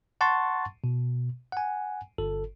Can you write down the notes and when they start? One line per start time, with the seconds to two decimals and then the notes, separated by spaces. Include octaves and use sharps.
0.21 F#5 A5 C6 C#6 A6
0.84 B2
1.52 F#5 G#5
2.18 G1 A4